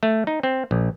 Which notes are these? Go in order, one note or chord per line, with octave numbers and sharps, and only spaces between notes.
A3
D#4
C4
A#1